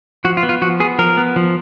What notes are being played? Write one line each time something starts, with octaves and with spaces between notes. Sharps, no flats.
F3 F#4
F4
B3
F4
F3 F#4
B3 G#4
F3 A#4
B3
F3